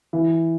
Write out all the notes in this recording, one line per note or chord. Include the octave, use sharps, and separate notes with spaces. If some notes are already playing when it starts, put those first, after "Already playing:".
E3